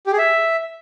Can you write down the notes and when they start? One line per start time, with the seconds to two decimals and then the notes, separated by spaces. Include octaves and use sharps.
0.07 G4
0.12 G#4
0.18 E5